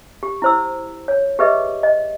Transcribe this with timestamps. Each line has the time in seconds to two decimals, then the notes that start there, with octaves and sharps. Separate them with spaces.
0.23 G4
0.42 E4 C5 E6
1.08 C#5
1.39 G4 G#4 B4 D#5 E5
1.83 D#5